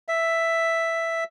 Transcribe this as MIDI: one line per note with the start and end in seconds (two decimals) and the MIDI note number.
0.08 1.24 76